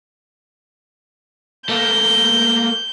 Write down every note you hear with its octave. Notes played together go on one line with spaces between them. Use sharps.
A3 A#3 G6